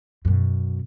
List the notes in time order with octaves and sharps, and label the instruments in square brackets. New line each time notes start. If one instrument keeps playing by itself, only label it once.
[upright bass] F#2 B2